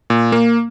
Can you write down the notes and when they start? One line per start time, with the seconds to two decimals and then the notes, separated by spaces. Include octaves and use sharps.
0.10 A#2
0.32 A#3